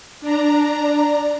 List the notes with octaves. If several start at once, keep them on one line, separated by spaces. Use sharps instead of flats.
D4 A#5